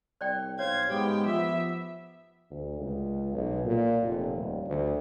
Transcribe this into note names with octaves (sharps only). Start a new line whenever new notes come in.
C2 C5 D5 G5
B1 C5 C#5 F5 G#6
G#2 G#3 B3 G4 G5
F3 B3 E5
D2
C#2
B1
A#2
F1
D#1
D2